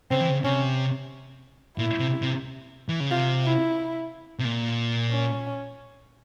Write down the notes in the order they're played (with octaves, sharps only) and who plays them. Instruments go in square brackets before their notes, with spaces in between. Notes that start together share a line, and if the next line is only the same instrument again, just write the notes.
[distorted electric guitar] C#3 [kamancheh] C4
[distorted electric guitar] E3
C#3
[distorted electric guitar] C3 [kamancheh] C#4
[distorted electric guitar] A#2 [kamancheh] E4
[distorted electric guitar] C3
C3
E3
C#3
[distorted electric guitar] C3 [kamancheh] F4
[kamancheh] E4
[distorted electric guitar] C3
A#2
[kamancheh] C#4